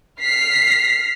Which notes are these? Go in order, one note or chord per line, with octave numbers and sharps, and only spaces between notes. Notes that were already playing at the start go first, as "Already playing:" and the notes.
F6 B6 C7